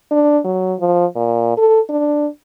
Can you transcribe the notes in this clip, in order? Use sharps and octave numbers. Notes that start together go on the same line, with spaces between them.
D4
F#3
F3
A#2
A4
D4